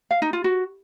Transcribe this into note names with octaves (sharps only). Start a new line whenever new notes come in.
F5
D#4
F4
F#4